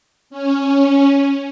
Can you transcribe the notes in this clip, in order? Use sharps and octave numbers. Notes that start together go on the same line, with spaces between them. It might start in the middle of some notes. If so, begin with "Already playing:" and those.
C#4